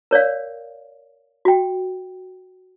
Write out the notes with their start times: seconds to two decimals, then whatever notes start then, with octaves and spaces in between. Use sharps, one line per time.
0.11 A#4 C#5 D5 F5
1.45 F#4 G5